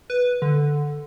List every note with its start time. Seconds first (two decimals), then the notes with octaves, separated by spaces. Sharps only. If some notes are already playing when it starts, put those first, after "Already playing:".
0.10 B4
0.42 D3